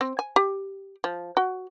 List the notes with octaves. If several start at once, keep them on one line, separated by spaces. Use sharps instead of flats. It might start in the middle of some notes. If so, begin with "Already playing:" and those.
C4
G#5
G4
F3
F#4